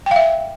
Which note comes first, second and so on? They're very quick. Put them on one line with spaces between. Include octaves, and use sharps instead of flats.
G5 F5 E5